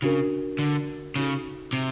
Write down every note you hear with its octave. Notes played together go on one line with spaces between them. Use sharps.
C#3 D4 F#4 A#4
D3
C#3 D#4 F#4 A4
C3